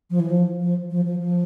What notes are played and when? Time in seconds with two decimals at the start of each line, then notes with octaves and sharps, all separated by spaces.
0.10 F3
0.20 E3
0.30 F3
0.61 F3
0.90 F3
1.05 F3
1.19 F3